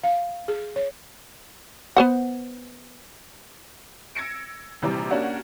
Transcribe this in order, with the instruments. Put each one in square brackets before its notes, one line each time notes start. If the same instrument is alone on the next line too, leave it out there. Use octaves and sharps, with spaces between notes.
[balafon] F5
G#4
C#5
[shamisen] B3 C5 F#5
[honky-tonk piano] E6 G#6 A#6 C#7 D7
A#1 C3 E3 G3 A#5 D6
A#3 C#4 D4 F#4 G4